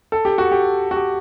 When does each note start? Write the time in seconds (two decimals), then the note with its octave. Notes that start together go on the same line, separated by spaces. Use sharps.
0.12 A4
0.25 G4
0.38 F#4
0.51 G4
0.91 F#4
0.96 G4